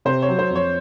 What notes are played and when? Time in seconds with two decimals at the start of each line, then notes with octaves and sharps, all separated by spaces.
0.05 C3 C5
0.22 C#5
0.28 F#3
0.39 C5
0.50 F2
0.55 C#5